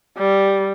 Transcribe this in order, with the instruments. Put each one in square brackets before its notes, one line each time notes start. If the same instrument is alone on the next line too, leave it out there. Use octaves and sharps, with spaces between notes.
[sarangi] G3